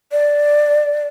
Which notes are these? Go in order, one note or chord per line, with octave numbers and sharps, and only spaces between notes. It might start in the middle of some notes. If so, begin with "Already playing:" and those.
D5